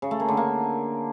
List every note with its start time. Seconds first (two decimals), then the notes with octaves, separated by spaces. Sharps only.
0.02 C#3
0.11 A3
0.20 A#3
0.28 D3
0.37 A#3